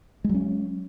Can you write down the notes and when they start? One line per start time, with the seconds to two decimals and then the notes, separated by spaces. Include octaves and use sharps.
0.24 G#3
0.29 F#3
0.34 C#4